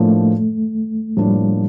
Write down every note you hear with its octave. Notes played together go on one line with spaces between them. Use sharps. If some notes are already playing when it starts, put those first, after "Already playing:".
Already playing: A2 F3 A3 A#3 D4
A2 F3 G3 A#3 D4